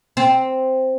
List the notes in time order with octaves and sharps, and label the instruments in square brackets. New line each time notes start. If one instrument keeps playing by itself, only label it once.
[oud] C4